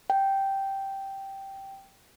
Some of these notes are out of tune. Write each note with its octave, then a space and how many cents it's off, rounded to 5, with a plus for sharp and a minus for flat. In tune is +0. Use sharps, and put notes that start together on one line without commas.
G5 -5